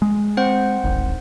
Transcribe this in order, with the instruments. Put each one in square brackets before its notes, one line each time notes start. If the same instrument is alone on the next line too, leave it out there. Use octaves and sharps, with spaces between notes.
[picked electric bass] G#3
[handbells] C4 C5 F#5
[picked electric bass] D1 G#1